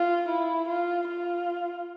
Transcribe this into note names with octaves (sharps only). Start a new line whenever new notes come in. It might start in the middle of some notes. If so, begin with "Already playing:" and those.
Already playing: F4
E4
F4
F4